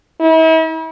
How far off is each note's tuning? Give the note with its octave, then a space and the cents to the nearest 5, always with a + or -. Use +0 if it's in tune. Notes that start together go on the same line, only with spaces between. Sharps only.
E4 -40